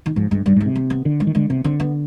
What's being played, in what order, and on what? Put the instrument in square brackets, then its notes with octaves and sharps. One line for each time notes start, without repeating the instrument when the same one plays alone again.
[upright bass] D#3
[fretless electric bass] G#2 [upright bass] F3
[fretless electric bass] G2 [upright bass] G#3
[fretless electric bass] G2 [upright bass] G3
[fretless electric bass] G#2 [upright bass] G#3
[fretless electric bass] C3
[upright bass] C4
B3
[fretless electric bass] D3
[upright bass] G#3
[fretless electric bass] D#3
[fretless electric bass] D3 [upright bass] G#3
[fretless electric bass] C3 [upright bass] B3
[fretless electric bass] D3 [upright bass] C4
[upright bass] B3